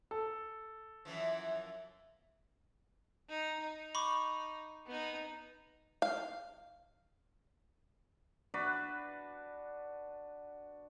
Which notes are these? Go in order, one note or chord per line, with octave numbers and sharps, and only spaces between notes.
A4
F#2 E3 F3
D#4
D#4
B5 C#6 D6
B3 D#4
F5
D4 F#4 B4